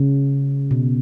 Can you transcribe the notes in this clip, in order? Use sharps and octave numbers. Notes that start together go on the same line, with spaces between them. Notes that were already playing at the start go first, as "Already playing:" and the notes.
Already playing: C#3
B2